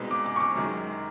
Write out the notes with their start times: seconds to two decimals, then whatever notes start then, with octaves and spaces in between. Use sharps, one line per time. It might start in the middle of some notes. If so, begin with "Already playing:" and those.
Already playing: C2 B2 G#3 C4 D#4
0.11 D6
0.26 D6
0.36 C#6
0.40 D6
0.55 F#2 D#3 G#3